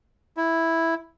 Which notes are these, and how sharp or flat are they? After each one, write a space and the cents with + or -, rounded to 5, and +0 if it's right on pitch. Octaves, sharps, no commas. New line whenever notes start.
E4 -5